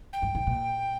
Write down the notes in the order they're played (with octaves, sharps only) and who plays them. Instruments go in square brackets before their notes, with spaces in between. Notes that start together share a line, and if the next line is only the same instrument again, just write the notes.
[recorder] G5
[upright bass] G2
G#2
A#2